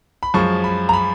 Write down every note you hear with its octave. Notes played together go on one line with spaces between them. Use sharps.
B5
F#2 F3 G#3 C#6
B5
A#5
B5